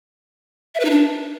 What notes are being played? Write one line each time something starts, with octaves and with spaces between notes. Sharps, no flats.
E5
B4
D#4
D4